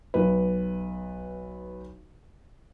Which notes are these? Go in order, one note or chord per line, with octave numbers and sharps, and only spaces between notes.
B1 B4